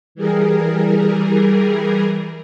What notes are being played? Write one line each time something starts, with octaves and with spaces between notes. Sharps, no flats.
E3 G3 G#4 A#4